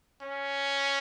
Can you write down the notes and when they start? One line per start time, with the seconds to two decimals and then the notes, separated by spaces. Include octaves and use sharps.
0.22 C#4